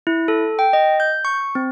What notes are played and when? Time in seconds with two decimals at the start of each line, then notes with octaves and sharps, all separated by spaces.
0.07 E4
0.28 A4
0.59 G5
0.73 D#5
1.00 G6
1.25 C#6
1.55 C4